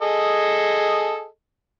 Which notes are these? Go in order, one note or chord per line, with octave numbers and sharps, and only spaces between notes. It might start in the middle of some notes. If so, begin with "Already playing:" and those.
G#4 A4 D#5